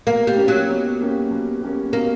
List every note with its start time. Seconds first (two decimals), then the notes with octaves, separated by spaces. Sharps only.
0.06 B2 A#3
0.27 G3
0.38 A#3 C#4 G4
0.48 F#3
0.69 B2
1.00 A#3 C#4 G4
1.31 B2
1.62 A#3 C#4 G4
1.93 B2 A#3